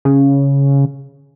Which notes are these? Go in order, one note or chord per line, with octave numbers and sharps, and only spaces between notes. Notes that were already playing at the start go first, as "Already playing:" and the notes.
C#3